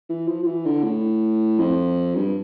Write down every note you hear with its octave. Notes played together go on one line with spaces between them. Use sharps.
E3
F3
F3
E3
D3
A2
F2
G2